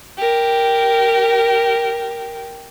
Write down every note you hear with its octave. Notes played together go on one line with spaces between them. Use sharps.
G4 A#4